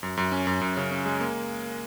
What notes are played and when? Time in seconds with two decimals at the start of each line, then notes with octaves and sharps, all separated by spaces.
0.03 F#2
0.17 F#2
0.32 C#4
0.47 F#2
0.61 F#2
0.77 C#3
0.91 C#4
1.06 G#3
1.21 A#3